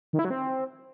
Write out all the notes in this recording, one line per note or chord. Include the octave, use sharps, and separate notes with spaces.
D#3
E4
F#3
C4